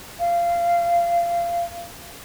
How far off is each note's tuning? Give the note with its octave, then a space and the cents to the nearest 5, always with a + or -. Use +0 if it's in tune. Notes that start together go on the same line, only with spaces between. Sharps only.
F5 -20